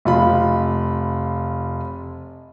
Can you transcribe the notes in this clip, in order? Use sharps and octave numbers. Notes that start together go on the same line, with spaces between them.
F1 F4 B5